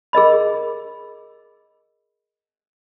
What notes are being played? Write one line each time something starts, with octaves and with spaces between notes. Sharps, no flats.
G#4 A#4 D#5 B5